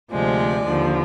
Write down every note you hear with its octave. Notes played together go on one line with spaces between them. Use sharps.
D2 C3 F3 G#3 D5
D#2 D3 F3